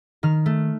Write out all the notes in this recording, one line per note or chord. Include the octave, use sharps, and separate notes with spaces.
D#3 F6
A3